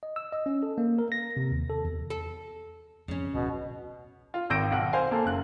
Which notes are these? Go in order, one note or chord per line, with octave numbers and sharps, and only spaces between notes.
D#5
E6
D#5
C#4
A4
A#3
A#4
A#6
C3
D#2
A4
E2
A4
F2 C#3 C#4
D1 B1 B2
F4
G#1 D#3 E6 G6 A#6 D7
B1 F#5
C5 F5 G#5
A#3 A4
F#1 F#6